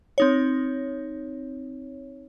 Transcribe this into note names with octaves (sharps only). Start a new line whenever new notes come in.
C4 D#4 C#5